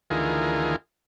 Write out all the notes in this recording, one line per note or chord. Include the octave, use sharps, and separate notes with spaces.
D2 D#3 E3 F4 G#4 A#4